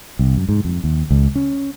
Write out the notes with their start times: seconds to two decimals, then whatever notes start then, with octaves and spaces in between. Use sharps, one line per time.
0.19 C2
0.36 F#2
0.49 G#2
0.65 F2
0.84 D#2
1.11 C#2
1.35 C#4